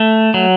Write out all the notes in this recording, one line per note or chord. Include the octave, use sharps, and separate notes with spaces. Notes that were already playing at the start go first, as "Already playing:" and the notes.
Already playing: A3
F#3